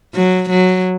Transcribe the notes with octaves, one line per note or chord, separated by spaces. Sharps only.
F#3
F#3